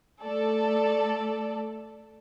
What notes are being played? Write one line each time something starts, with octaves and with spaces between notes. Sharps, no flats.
A3 A4 D5